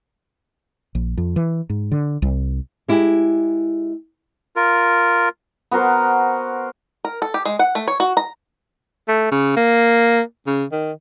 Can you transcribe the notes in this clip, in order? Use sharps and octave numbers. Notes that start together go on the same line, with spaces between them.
A#1
F2
E3
G#2
D3
C2
G#3 E4 G4
F4 A#4
B3 F#4 A#4 C5
A#4
A4
G4
G#3
F#5
A3
C#5
F#4
A#5
A3
C#3
A#3
C#3
D#3